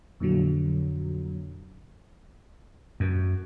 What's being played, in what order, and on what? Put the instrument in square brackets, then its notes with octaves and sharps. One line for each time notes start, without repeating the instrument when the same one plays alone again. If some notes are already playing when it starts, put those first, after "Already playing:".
[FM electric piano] F2 A#2 D3 F#3
[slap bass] F#2